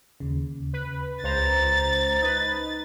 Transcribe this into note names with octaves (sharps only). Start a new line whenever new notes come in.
D#2 C#3
B4
C#2 C5 A#5 A6
D#4 B4